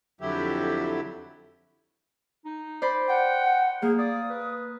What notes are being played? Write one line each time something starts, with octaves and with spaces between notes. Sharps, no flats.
F2 D3 F#3 E4 G4
D#4
C5 D5 B5
F#5 G5
A#3 G#4
D5 D#6
B4